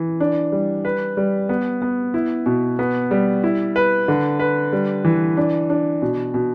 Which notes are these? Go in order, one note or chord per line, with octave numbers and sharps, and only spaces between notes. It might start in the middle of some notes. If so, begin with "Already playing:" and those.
Already playing: E3
D4
G3
B4
G3
B3
B3
E4
B2
B3
G3
E4
B4
D3
B4
G3
E3
D4
D4
B2
B2